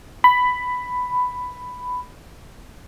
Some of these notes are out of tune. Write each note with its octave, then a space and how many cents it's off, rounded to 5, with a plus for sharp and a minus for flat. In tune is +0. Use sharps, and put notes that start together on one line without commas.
B5 +10